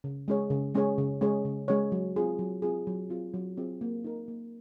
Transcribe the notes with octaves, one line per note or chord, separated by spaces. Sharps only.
C#3
G#3 C#4 G#4 C#5
C#3
G#3 C#4 G#4 C#5
C#3
G#3 C#4 G#4 C#5
C#3
G#3 C#4 G#4 C#5
F#3
C4 F4 G#4
F#3
C4 F4 G#4
F#3
C4 F4 G#4
F#3
C4 F4 G#4
A#3
D#4 A#4
A#3